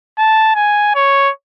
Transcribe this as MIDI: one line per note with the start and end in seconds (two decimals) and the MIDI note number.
0.18 0.54 81
0.55 0.91 80
0.95 1.31 73